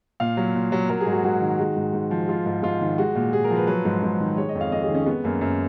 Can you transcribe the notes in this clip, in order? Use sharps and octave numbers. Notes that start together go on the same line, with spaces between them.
A#2 F5
F#3
A#2
F#3
F#3 A#4
G#4
G#2
F#4
G#2 F#4
D#3
G#3
G#2
G#2
F3
G#3 F4
G#2
G#2 F4
D#3
G#3 F#4
A#2
A#2 G#4
A#4
F3
B4
F#3 B4
G#2
G#2
D#3
G#3 C#5
D#5
F2
F5
F2 D#5
G#4
D#3
C#4
G#3 B3
F#2 A#3
F#2